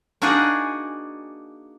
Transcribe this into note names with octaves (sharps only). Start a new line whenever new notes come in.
A#3 D4 D#4 F#4 G#4 G#5